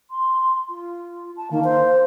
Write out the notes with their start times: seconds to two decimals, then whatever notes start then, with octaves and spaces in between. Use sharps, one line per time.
0.11 C6
0.69 F4
1.37 A5
1.51 D#3 A#3
1.64 C5